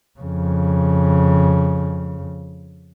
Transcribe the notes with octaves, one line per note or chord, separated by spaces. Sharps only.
F2 C#3